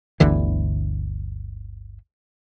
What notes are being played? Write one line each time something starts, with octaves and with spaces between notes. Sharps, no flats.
G1 D2 D3 E3